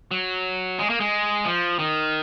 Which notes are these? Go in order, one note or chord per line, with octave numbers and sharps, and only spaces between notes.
F#3
G#3
A#3
G#3
F3
D#3